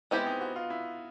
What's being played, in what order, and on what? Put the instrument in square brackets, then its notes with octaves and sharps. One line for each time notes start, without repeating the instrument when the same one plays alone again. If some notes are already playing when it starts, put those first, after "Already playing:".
[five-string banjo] G#3 C4 E4 G4 C5 [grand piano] B3
[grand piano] D#4
F#4
F4
E4